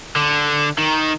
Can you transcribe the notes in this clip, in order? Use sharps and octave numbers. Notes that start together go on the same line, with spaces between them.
D3
D#3